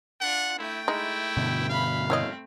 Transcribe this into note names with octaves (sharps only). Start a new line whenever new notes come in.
D4 F4 F#5
A3 E4 G5
G#3 D#4 E4
G2 B2 D3
E5 F5 B5
A3 C4 E4 C#5 D#5